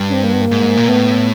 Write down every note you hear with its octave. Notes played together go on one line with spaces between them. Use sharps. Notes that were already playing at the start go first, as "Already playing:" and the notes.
Already playing: G2
C#4
C4
A#3
B3
A#3
G#2
A#2
A2 B3